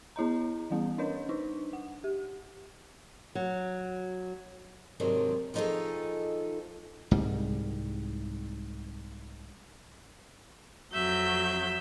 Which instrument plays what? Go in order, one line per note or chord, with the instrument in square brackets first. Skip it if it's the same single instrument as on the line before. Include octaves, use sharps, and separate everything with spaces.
[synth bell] B3 E4 D#5 A#5
E3 G3 B3
C#4 D4 C#5 D#5 G6
D4 D#4
F#5
G4
[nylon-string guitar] F#3
[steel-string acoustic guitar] G#2 C3 D#3 F#3 D4
D#3 F3 D#4 F4 G#4 A4
[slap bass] C2 G#2 G3
[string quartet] F2 F#3 G6 [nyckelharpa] E5